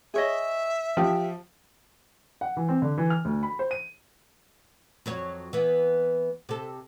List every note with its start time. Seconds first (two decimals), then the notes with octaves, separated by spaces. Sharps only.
0.14 G#4 C#5 D#5 E5
0.97 F3 G4
2.41 F#5
2.57 E3
2.69 C4
2.82 D3
2.98 E3
3.10 F6
3.25 D2
3.43 B5
3.59 C5
3.71 D#7
5.06 F2 F#3 C#5
5.53 E3 B3
6.49 C3 A4